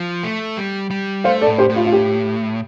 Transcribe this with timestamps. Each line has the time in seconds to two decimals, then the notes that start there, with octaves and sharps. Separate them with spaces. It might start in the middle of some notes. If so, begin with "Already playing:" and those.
Already playing: F3
0.23 A3
0.57 G3
0.90 G3
1.24 A3 C5 F5
1.41 A4 D5
1.47 A2
1.58 G4 C5
1.70 A2
1.76 F4
1.86 F4
1.92 G4